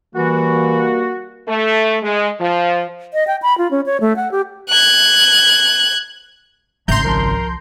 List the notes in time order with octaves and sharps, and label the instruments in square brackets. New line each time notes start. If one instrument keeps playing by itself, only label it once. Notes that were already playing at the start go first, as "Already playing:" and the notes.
[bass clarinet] E3 [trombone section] G3 A#3 [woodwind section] F#4
[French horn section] A3
G#3
F3
[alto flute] D#5
G5
B5
F4
C#4
C#5
A3
F#5
G4
[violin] F#6 G#6
[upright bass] G#1 C#3 [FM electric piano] A2 E5 A#6 [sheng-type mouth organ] A#5 [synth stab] C6 G6
[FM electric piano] C2 F3 A5 [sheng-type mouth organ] A#4